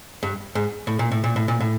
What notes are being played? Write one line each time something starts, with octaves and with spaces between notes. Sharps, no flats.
G2
G#2
A2
A#2
A2
A#2
A2
A#2
A2